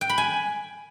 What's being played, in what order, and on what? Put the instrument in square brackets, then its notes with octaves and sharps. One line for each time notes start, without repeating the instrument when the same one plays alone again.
[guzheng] G5
B5
G#5